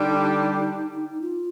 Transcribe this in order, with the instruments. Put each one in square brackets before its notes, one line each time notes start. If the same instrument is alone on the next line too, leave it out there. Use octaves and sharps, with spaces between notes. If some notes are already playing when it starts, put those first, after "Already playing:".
Already playing: [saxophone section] D3 G3 D4 G4 [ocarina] D#4
[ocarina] F4